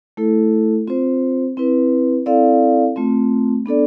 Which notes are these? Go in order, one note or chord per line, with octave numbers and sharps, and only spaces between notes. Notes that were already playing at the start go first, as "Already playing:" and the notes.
A3 E4 A4
C4 F4 C5
C4 E4 B4
C4 E4 A4 D5 F5
A3 C4 F4
B3 D4 A4 D5